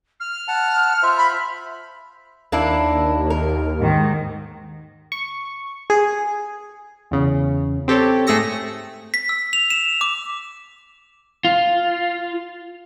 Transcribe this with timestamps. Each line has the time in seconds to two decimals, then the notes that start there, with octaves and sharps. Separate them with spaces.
0.20 F6
0.48 F#5 A5
1.03 F4 C5 E5
1.17 B5
2.52 D#2 A#3 D4 E4
3.30 A#4
3.81 G#2 D#3
5.12 C#6
5.90 G#4
7.11 E2 C#3
7.88 C4 G4 A4 C#5
8.27 G#2 A3 G#4 E6 A#6 C#7
9.14 B6
9.29 E6
9.53 F7
9.70 E7
10.01 D6
11.45 F4